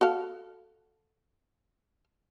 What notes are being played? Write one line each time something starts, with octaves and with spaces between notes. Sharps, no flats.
F#4 A4 F5